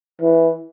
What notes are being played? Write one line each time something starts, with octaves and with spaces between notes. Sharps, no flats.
E3